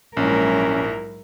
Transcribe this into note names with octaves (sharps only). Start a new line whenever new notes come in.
A#1 G#2 F#3 C#4 E4 A#4